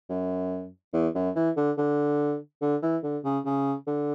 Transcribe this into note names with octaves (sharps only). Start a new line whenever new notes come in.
F#2
E2
F#2
E3
D3
D3
D3
E3
D3
C#3
C#3
D3